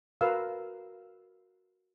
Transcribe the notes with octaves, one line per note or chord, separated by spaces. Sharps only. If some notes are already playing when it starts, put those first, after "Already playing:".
F#4 A#4 B4 F5 E6